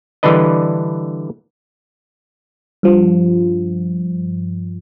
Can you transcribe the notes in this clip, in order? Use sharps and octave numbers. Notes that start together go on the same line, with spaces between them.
D3 E3 G3 D4 B4 D#5
G2 F3